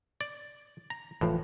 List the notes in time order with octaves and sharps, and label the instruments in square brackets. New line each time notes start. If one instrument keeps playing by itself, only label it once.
[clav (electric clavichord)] D5
A#5
[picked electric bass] F1 E3 F3 [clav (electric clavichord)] A2